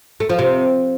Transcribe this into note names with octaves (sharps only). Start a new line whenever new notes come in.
A3
F3
C3